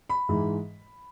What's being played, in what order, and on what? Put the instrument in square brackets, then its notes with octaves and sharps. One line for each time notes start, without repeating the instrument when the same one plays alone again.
[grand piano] B5
G#2 E3 G#3